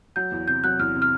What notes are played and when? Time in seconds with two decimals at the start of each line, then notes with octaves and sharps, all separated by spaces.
0.16 F#3 G6
0.32 E2
0.47 C3 G6
0.64 F#3 F#6
0.79 E2 F6
0.95 C3
1.02 F6